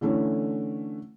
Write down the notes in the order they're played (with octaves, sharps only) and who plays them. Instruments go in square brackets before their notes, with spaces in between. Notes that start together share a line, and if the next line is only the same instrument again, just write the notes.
[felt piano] D3 E3 A3 C#4